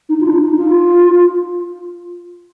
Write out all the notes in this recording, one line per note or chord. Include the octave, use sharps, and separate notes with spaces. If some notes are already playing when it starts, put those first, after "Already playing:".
D#4
F4
D4
D#4
D#4
F4